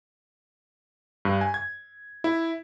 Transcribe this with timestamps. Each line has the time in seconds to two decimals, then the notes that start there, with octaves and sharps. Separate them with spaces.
1.25 G2
1.41 G#5
1.54 G#6
2.24 E4